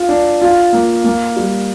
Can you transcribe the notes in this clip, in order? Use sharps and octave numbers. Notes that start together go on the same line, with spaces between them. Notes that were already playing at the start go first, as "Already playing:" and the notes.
Already playing: F4
D4
F4
A#3
A#3
G3